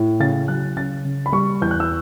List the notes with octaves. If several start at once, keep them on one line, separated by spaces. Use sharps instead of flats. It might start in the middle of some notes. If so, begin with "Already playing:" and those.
Already playing: A2
C#3 A6
F#3 F#6
C#3 A6
C#3
B5
G3 C#6
E2 G6
F#6
E6